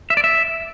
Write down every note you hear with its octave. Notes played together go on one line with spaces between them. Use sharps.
E5
D5
E5